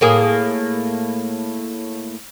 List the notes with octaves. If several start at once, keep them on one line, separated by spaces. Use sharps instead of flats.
A2 A#3 G#4